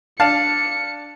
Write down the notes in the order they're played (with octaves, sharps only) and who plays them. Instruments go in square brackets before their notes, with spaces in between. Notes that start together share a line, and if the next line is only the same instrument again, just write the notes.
[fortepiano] D4 F5 A5 [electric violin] C#7